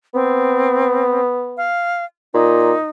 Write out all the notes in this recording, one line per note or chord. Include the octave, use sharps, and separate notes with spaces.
B3 C4
F5
A#2 D#4